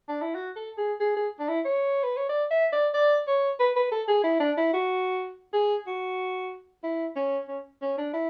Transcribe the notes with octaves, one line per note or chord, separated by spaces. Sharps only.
D4
E4
F#4
A4
G#4
G#4
G#4
D4
E4
C#5
B4
C#5
D5
E5
D5
D5
C#5
B4
B4
A4
G#4
E4
D4
E4
F#4
G#4
F#4
E4
C#4
C#4
C#4
D4
E4